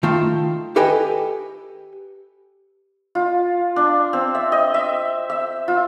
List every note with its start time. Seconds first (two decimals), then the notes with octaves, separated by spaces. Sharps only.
0.03 D#3 A3 F4 A5
0.76 G4 A4 B4 D#5 G5 G#5
3.15 F4
3.76 D4
4.13 C4
4.35 E5
4.52 D#5
4.74 E5
5.30 E5
5.68 F4